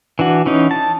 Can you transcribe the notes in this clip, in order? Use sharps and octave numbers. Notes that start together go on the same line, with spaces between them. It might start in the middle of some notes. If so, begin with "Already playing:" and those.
E3 D4 F#4
E3 C#4 D#4
A5